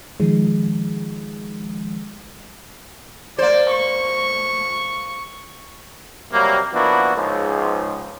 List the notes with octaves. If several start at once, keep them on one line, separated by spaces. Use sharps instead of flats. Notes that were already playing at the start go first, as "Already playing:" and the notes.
D#3 F3 G#3
A#3 C5 D5
C#6
C3 F#3 G3 A#3
F3 A#3 B3 D4 E4 F#4
C#2 G#2 F3